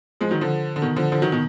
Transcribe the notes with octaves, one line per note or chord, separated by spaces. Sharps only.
F3 G#3
D#3 F#3
D3 F3
D3
B2 D#3
D3 F3
D3 F3
D#3 F#3
B2 D#3